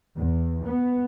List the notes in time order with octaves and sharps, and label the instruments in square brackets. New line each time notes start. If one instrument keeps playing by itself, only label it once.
[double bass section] E2
B3